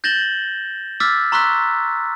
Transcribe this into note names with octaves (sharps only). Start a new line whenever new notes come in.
G6 A6 A#6 E7 F#7 G7
D6 E6 F6 A6 B6
A#5 C6 C#6 E6 F#6 B6